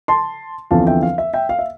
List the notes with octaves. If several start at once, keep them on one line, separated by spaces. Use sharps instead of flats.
A5 C6
E2 D3 F3 C4 F5 A5
E5 G5
F5
E5
E5 G5
F5
E5